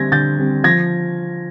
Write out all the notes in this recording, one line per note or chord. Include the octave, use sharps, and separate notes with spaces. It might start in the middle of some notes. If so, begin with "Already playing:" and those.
Already playing: D3 G3 C4 G#6 A#6
D3 G6 A6
G3 C4
F3 G#6 A#6